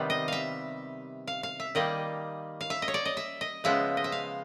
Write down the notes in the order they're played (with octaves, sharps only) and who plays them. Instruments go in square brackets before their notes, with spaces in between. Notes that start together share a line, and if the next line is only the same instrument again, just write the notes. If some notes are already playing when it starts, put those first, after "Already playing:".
Already playing: [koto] C3 D#3 G3 B3
D#5
E5 F5
F5
F5
E5
D#3 G3 A#3 D#5
F5
E5
D#5
C#5
D5
D#5
E5
D#5
C#3 F3 G#3 B3 E5
D#5
E5
F5